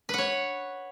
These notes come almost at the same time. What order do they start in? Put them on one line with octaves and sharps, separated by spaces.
B4 F#5 C#5